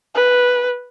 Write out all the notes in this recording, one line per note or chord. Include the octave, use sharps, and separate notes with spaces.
B4